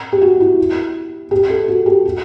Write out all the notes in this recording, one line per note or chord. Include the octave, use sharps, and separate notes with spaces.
G4
F#4
E4
G4
A4
F#4
G4
F#4